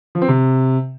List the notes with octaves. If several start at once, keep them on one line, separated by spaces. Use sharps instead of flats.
F3
C4
C3